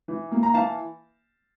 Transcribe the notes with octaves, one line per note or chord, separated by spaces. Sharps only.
E3
A#3
A#5
E3 F5 A5